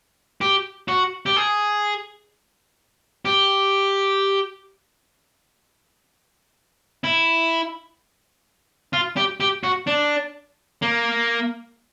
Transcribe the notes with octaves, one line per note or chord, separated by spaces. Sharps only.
G4
F#4
G4
G#4
G4
E4
F4
G4
G4
F#4
D4
A#3